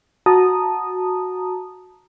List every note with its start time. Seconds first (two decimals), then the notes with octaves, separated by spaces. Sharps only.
0.26 F#4 A5 A#5 D#6